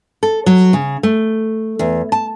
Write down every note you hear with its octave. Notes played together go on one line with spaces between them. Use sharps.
A4
F#3
C#3
A3
E2
A5